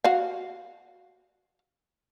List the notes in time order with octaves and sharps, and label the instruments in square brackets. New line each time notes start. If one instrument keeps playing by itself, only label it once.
[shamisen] F#4 F5